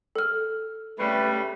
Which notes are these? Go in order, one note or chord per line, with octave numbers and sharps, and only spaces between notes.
A4 F6
C#3 G3 A3 B4